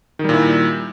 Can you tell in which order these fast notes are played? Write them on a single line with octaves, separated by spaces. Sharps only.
D#3 G3 A#2 E4